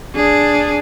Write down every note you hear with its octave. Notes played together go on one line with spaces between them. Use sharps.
D4 G#4